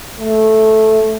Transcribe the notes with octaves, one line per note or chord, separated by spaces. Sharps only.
A3